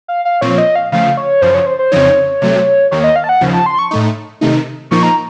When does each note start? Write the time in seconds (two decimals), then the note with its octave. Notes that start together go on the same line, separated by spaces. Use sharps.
0.08 F5
0.25 F5
0.41 A#2 F3 C4 C#5
0.58 D#5
0.76 F5
0.92 C#3 F3 A3 F5
1.17 C#5
1.42 F#2 C#3 F3 C5
1.54 C#5
1.66 C5
1.79 C5
1.92 F2 C#3 F3 C4 D#4 C#5
2.42 C3 F#3 A3
2.91 D#2 D#3 A#3 C#5
3.04 D#5
3.16 F5
3.24 A5
3.29 F#5
3.41 D#2 C#3 F3
3.53 A5
3.66 C6
3.79 C#6
3.91 A2 A3 D#4
4.41 C3 D#3 A3 D#4
4.91 A#2 F3 A#3 D#4 C#6
5.03 A#5